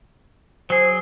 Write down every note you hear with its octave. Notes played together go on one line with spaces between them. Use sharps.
F#3 G#4 C5